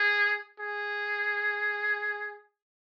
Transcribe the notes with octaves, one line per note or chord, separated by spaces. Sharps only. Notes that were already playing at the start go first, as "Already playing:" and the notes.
Already playing: G#4
G#4